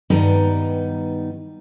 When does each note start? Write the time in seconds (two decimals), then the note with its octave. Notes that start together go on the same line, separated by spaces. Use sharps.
0.10 G2 D#3 G3 B3 D#4 A#5